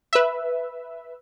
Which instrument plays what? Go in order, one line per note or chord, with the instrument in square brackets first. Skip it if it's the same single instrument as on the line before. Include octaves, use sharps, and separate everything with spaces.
[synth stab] B4 E5